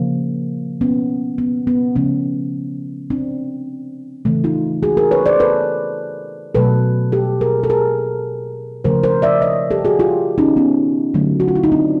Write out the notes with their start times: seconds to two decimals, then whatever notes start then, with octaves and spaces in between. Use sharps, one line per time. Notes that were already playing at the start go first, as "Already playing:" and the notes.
Already playing: C#3 F3 A#3
0.81 B3 C#4
1.38 B3
1.67 B3
1.96 C#3 F3 A3 B3 C#4
3.10 C4 D4
4.25 C#3 E3 A3
4.44 D#4 F4
4.83 F#4 G#4
4.97 G#4 A#4
5.11 B4 C#5
5.26 C5 D5
5.40 A4 B4
6.55 B2 F#3 A3 A4 B4
7.12 G4 A4
7.41 G#4 A#4
7.63 A4
7.70 G#4 A#4
8.84 C#3 F3 A3 A#4 C5
9.03 A#4 C5
9.22 D5 E5
9.42 C#5 D#5
9.71 G4 A4
9.85 F#4 G#4
9.99 F4 G4
10.38 C#4 D#4
10.56 B3 C#4
11.14 D3 F#3 A3
11.40 F#4
11.48 F4
11.55 E4
11.64 D#4
11.72 C4 D4